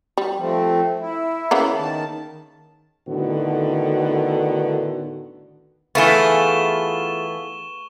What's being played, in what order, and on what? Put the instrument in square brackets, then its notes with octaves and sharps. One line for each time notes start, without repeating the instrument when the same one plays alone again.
[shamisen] G3
[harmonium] F3 A3 C4
E4
[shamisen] C#3 A#3 B3
[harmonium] D#3 A5
[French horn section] A2 D3 D#3 B3 F#4
[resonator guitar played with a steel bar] E3 A3 B3 [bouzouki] F4 G#4 [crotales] C#6 E7 G7